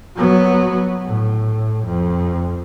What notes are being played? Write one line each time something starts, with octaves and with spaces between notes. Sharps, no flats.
F#3 B3
A2
F2